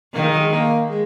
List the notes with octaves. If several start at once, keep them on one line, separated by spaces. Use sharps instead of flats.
D#3 A#3
G#3
F#3
G#3
A#3
G#3